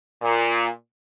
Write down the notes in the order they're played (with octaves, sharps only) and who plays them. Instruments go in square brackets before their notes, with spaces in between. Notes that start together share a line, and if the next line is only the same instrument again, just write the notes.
[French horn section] A#2